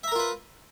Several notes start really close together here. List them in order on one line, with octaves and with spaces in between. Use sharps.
E5 A#5 A#4 F4 B4